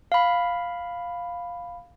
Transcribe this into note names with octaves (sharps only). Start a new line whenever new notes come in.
F5 B5